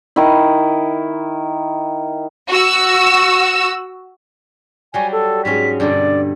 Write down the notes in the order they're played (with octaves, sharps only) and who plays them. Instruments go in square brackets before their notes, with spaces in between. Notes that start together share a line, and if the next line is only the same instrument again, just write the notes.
[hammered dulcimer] D#3 E4
[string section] F#4 E6
[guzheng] F#3 G3 F#4 [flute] G#5
[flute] A4
[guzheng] G#2 F#3 C#4 [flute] B6
[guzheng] G2 B2 D3 [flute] D5